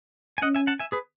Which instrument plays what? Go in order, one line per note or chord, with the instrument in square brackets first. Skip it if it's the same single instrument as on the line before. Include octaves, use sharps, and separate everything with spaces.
[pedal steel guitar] G#5
[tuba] C#4 [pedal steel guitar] D#5 F#5
[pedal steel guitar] E5 G#5
F#5 A5
E5 G#5
G#4 B4